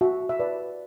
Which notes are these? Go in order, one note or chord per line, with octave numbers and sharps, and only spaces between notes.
F#4 E5
E5
B4 D5